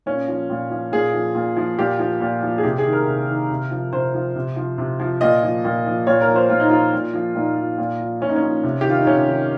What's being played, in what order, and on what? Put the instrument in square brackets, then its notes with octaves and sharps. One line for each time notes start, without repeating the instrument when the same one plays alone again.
[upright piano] A#2 C#4
F3
A#2
F3
A#2 G#4
F3
A#2
F3
A#2 G4
F3
A#2
F3
G#4
C3 G4
G#4
D#3
A#4
C3
D#3
C3
F3
C3 C5
F3
C3
F3
C3
F3
A#2 D#5
F3
A#2
F3
A#2 C#5
A#4
F3
C5
A#2 F4
D#4
F3 F4
A#2
F3
A#2 D#4
F3
A#2
F3
A#2 C#4
D#4
C#4
F3
C3
G4
D#3 F4
D#4
C3 C#4
D#3